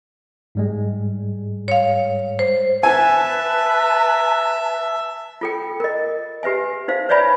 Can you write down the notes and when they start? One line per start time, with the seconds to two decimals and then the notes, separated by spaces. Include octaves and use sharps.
0.55 G#2 G3 G#3
1.68 C#5 F5
2.39 C5
2.83 B4 E5 G#5 A5
5.41 F4 A4 G5
5.80 A#4 D#5
6.43 G4 B4 E5 G#5
6.88 D#4 C5 F5
7.09 B4 C#5 D5 E5 G#5 B5